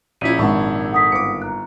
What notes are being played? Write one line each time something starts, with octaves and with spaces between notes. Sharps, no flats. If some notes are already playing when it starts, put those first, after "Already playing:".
A#1 C#4 E4 F4 B6 D#7
G#1 D4 C#5 F#5 A5 C#6
A4 F#5 D#6 B6
G1 D6 C#7
A#5 F#6